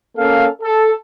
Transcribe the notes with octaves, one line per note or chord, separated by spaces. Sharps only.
A#3 C#4 A4 F5
A4